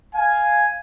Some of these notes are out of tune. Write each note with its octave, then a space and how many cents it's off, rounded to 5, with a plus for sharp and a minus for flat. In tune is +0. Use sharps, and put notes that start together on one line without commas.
F5 +0 G#5 +0